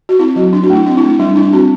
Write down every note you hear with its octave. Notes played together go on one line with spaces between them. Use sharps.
F#4
C4 E4
F#3 F#4
D4
F#4
A3
E4
C4 D4
E4
A3
E4
G3 D4
D4 E4
C4 F#4